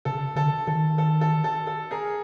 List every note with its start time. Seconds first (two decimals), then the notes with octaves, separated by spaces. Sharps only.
0.05 C#3 A4
0.36 D3 A4
0.67 D#3 A4
0.98 A4
1.21 A4
1.44 A4
1.67 A4
1.91 G#4 A#4